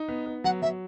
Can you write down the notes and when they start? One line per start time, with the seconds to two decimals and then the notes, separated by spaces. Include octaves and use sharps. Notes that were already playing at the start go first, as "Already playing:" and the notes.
Already playing: D#4
0.08 B3
0.26 B3
0.44 F#3 F#5
0.62 F#3 E5